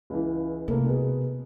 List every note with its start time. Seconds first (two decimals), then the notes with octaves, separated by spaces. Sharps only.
0.10 C#2 E3
0.68 C3 A3 A#3
0.86 B2 B3 G#4